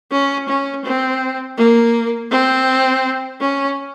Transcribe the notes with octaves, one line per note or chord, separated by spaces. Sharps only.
C#4
C#4
C4
A#3
C4
C#4